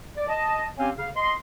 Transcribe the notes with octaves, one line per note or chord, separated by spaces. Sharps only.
D5
D#5 A5
C4 C#4 G4 C#5 F5 G#5
C#3 F5
D#5 C6